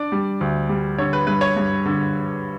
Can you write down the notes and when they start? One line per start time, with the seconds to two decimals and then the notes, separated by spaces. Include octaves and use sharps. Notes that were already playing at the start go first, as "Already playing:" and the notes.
Already playing: D4 D5
0.12 G3
0.41 D2
0.69 G3
0.98 D3 C#5
1.13 B4
1.27 G2 B4
1.41 C#5
1.56 G2
1.85 D3